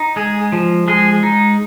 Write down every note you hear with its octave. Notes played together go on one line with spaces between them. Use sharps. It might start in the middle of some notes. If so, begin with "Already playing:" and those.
Already playing: D#4
G#3 G#4
F3
G#3 G#4
D#4